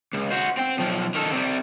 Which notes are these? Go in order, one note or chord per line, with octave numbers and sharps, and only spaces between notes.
C#2
F#4 C5
C4 G5
B1 F3
D#3 A4
C3 G3